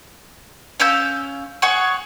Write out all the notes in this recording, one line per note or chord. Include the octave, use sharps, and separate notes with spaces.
C#4 F5 E6 G6
G#4 C#5 F#5 C#6